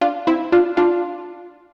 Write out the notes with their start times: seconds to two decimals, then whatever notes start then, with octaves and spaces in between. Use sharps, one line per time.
0.01 D4 F4
0.27 C4 E4
0.52 D4 F4
0.77 D4 F4